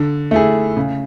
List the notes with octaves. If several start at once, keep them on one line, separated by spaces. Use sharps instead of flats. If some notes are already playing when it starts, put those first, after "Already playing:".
Already playing: D3
A3 E4 G#4
C#3